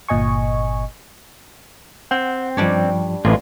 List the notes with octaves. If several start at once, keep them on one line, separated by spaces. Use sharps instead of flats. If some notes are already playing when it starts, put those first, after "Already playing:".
G1 A#2 D#5 G#5 C#6
C4 F#5 G5
G2 F3 G3 D4 C#5
A1 G#3 A3 C4 F4 B4